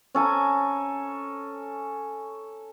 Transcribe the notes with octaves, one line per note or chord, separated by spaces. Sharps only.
C#4 A4 G#5 A#5